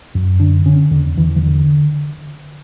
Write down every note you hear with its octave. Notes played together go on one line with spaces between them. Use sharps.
F#2
D3 D4
D3 C#4
E2 D3
E2 E3
E3
D3